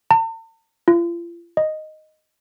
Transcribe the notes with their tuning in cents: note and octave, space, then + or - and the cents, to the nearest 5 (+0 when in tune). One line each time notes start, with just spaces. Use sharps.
A5 +45
F4 -40
D#5 +0